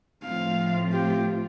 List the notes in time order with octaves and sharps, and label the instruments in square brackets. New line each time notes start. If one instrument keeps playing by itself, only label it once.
[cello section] A2 F3 A3 C4 F4 [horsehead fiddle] F5
[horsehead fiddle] G4